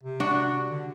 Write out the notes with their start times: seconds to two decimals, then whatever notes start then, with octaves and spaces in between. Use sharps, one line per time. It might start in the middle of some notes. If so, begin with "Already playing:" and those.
0.04 C3
0.20 D4 F#4
0.70 D3